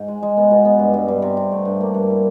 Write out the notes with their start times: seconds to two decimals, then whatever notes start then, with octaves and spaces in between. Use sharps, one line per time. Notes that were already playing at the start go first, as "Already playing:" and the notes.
Already playing: G#2
0.08 G#3
0.23 G#3
0.37 B3
0.51 B2
0.65 B3
0.79 G2
0.94 G2
1.08 G2
1.22 C3
1.37 C3
1.52 A3
1.65 G2
1.81 A#3
1.94 G2
2.10 E4